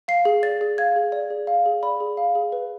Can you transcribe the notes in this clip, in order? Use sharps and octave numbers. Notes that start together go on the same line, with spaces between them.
F5 C7
G#4
D5 A6
G#4
F5 G#6
G#4
D5
G#4
F5
G#4
D5 B5
G#4
F5
G#4
B4